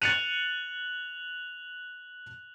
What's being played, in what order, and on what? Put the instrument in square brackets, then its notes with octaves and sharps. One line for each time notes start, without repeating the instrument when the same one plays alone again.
[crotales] F#6 F7 F#7 [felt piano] A6 C#7 D#7